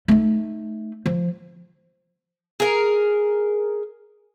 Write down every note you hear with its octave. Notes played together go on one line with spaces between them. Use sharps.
A3 D#4
F3
G#4 A#4